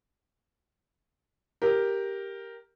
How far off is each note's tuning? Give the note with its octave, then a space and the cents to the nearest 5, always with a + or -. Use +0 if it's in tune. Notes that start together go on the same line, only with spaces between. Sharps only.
G4 +0 A#4 +0